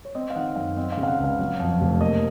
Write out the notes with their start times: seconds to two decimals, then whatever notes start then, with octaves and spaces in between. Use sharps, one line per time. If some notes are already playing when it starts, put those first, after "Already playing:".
0.05 C#5
0.15 C4 D#5
0.30 F5
0.36 D#3 F#5
0.56 F#2 F5
0.77 C4 D#5
0.92 F5
0.97 C#3
1.03 F5
1.07 F#5
1.18 C#2
1.24 F5
1.39 F#3
1.60 F2
1.81 F1
2.01 A#3 D#5